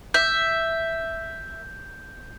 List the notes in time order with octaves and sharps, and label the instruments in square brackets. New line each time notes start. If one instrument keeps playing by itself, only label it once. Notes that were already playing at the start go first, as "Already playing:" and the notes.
[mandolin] E5 [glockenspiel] G6